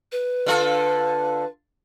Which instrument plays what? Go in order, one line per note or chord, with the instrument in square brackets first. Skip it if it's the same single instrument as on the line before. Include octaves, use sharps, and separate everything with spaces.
[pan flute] B4
[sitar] D3 F4 A4